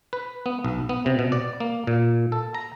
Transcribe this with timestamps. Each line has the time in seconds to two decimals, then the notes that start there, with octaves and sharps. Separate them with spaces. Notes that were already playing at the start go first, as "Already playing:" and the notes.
0.13 B4
0.46 B3
0.65 B1
0.89 B3
1.06 C3
1.19 B2
1.32 D5
1.60 A#3
1.87 A#2
2.32 A4
2.55 A#5